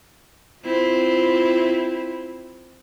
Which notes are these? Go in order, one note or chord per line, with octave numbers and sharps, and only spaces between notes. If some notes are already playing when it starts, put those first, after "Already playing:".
C4 E4 F4